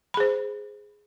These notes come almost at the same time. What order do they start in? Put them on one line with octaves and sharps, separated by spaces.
B5 G#4 C5